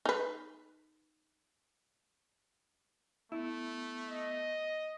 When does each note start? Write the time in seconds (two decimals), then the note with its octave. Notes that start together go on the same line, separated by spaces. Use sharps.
0.05 D#4 B4
3.32 A3 B3 E4
4.09 D#5